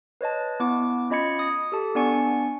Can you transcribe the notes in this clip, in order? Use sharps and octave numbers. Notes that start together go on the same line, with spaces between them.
B4 C#5 D#5 A5
B3 E4 D6
C#4 F4 D#5 B5 G#6 C#7
D#6 A#6
G4 A4 A5
B3 D4 D5 G#5 C#6 C#7